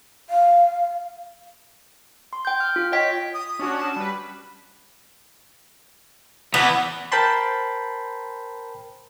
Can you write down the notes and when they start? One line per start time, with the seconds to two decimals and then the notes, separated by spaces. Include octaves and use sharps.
0.30 F5
2.33 C6
2.45 G5 G6
2.60 F6
2.76 F4
2.92 C#5 D#5 G5 B6
3.34 D#6
3.59 C#4 D4 F#4
3.79 A5
3.96 G3 B4
6.54 E2 E3 B3
7.12 A#4 C5 G5 A5 B5 C6